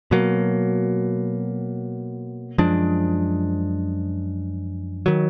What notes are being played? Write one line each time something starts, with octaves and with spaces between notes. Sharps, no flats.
B2 F#3 A#3
F#2 F3 G#3 D4
D#3 F#3